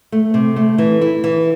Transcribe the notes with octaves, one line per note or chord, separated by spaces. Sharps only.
A3
C3
A3
E3
E4
E3